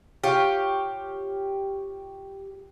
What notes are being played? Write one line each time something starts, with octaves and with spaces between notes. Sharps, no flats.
F4 G4 C#5